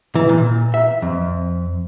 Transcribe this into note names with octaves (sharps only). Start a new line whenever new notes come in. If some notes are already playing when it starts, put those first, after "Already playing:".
E3
A#2
E5
F2